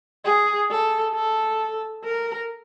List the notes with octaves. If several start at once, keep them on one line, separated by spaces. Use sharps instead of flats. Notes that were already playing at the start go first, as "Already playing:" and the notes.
G#4
A4
A4
A#4